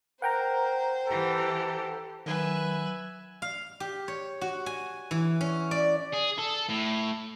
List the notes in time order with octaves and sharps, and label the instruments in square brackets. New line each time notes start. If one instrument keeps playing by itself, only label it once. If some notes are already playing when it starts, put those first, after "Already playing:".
[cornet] A#4 [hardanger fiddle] C5 [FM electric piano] F#5 G5 A#5
[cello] E3 G4 [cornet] A4
[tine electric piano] D#3 [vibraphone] F#3 [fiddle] B4 [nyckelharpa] E5 G#5
[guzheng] F5
G4
C#5
F#4
G#5
E3
C#4
D5
[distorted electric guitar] G#4
A4
A2